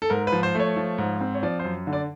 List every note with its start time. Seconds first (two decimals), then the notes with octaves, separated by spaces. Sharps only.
0.02 A4
0.10 G#2 A#4
0.27 B4
0.32 F3
0.43 C5
0.55 A3 C#5
0.76 F3
0.98 G#2
1.21 C4
1.34 C#5
1.43 F3 D5
1.59 C5
1.65 F#2
1.87 D3
1.93 D5